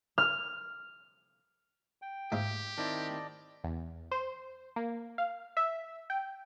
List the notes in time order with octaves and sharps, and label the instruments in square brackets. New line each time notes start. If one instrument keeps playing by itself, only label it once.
[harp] F6
[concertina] G5
[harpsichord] G#2 F4 E5 [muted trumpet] G4
[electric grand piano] D#3 C4 E4 [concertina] D5 D#5 A5
[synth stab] E2
C5
A#3
F5
E5
G5